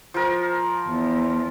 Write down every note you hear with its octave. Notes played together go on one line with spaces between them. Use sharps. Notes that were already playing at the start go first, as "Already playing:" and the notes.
F3 A#4
E2